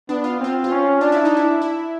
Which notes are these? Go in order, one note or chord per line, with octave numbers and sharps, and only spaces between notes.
B3 D4
F4
C4 F4
F4
C#4
D4 F4
E4
D#4
E4
E4